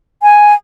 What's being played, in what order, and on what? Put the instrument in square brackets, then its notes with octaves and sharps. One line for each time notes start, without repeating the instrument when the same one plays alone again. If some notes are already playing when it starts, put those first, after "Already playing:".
[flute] G#5